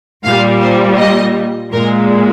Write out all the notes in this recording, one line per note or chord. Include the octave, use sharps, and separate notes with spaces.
A#2 G3 F5
C5
D#5
A#2 G#3 A#4